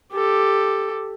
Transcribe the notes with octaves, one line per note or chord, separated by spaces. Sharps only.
G4 A4